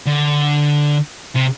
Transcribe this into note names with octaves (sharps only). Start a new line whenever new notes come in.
D3
C3